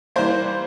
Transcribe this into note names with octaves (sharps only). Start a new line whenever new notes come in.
E3 G3 A#3 C5